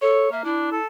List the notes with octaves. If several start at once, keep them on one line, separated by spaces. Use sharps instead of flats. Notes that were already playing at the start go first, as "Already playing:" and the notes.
A4 C#5
A#3 E5
D4 E4
A4